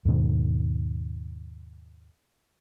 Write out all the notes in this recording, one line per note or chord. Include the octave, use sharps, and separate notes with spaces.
D#2 G#2 B2 D#3